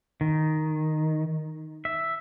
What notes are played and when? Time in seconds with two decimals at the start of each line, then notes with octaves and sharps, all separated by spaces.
0.21 D#3
1.85 E5